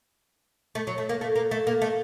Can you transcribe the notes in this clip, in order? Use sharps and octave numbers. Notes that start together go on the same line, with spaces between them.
A3
F#3
A3
A#3
A3
A#3
A3
A#3
A3